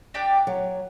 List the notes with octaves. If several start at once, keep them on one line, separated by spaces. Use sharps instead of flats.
D4 G4 D5 G5
F#3